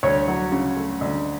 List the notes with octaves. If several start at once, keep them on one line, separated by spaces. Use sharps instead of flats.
D2 C#5
F#3
C#3
A3
D2